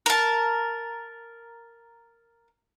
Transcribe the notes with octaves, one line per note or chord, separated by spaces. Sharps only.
A#4 A5